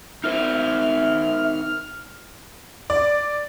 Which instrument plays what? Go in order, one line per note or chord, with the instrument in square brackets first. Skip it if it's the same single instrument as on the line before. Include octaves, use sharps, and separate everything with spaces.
[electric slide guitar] D#4 A#4 C5 [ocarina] E5 [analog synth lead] F6
[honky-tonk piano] D5